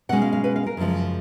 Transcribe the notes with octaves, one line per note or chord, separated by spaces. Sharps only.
B2 G#3 C#4 F#5
F5
F5
B4
F5
A#4
F#2 C#3 F3 G#3